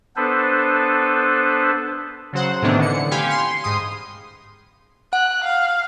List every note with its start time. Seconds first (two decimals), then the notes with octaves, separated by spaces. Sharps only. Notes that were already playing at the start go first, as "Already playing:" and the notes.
0.16 B3 D4 A4 B4 C5
2.33 C#3 F#3 C5 F#5
2.62 A2 C3 D#3 E3 B3 D4
2.79 D3 E3 C#7
3.11 G4 F5 G#5 B5 C6
3.30 C6
3.64 G#2 C6 D#6
5.13 F#5 F#6
5.44 F5